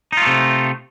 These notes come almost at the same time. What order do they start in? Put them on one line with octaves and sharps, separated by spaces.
D#4 F4 A3 C3